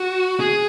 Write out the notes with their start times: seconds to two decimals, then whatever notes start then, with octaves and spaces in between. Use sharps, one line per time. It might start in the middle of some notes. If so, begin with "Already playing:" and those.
Already playing: F#4
0.40 G#4